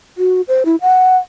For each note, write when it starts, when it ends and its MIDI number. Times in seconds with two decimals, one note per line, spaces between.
0.18 0.42 66
0.48 0.63 72
0.65 0.76 64
0.81 1.17 78